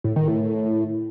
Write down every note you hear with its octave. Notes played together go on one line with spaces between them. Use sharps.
A2
D#3
A2